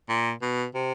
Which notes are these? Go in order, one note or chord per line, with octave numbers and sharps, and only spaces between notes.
A#2
B2
C3